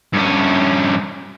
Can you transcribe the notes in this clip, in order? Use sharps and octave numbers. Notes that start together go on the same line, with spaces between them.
G2 C#4